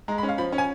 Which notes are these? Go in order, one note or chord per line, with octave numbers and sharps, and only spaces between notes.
G#3 A#5
B5
C#4
F5
F3 B5
C#4
G#5